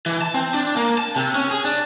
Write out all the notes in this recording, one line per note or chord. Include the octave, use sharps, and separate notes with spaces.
E3
A5
C4
D4
A#3
A5
C3
C#4
G#4
D4